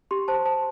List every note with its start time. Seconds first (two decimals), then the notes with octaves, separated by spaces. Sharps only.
0.11 G4 C6
0.28 C5 A5
0.45 C5 A5